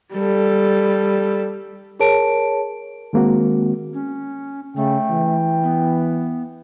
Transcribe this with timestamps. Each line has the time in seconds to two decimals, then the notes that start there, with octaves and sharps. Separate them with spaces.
0.15 G3 A4
2.00 G#4 A#4 C#5 A5 D7
3.13 D#3 G#3 A#3 C4 F#4
3.93 C#4
4.76 C#3 A3 G5
5.11 E3
5.63 B3